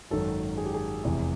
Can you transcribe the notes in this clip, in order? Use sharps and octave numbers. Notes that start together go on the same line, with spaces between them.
G#1 F#2 D#3 A4
G#4
G4
G#4
F1 E2 C3 E3